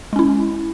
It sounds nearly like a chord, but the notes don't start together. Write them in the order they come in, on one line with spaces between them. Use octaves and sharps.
G#3 C#4 E4